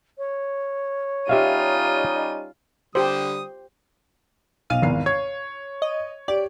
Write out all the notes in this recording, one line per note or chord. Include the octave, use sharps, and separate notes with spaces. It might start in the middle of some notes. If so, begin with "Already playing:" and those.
C#5
G3 C#4 D#4 F4 G4 E5 F5 D#7
D3 G3 G4 C5 D#6
B1 F5 D#7
G#1 E2 C7
C#5 G#6
D#5
G4 D5